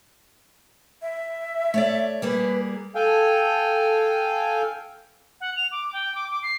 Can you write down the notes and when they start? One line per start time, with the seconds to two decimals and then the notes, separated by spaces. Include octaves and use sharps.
1.02 E5
1.74 A3 C#5 D5
2.22 G3 A#3 G#4 B4
2.95 A4 F5 G5 G#5
5.41 F#5
5.56 F7
5.72 D6
5.93 G5
6.15 D6
6.30 D6
6.43 C7